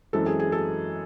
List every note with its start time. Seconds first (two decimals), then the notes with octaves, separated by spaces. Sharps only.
0.13 F#2 E3 G#3 C4 A4
0.26 G#4
0.40 G#4
0.52 A4